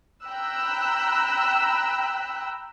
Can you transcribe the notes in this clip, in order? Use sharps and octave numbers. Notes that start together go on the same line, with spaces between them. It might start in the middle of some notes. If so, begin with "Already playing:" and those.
G5 A#5 B5 E6 F#6